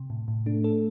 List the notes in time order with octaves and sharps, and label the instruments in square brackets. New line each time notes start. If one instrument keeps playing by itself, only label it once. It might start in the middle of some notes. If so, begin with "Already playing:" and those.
Already playing: [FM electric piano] C3
A2
A2
[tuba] A3 [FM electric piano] D4
[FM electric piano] A4